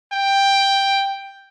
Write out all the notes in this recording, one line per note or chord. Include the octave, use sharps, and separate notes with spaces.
G5